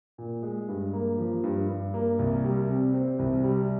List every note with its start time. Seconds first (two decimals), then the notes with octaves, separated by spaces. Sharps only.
0.18 A#2
0.43 G#3
0.68 G2
0.93 A#3
1.18 F3
1.44 G2
1.69 G2
1.94 A#3
2.19 C2
2.44 G3
2.69 C3
2.94 C4
3.19 C2
3.44 G3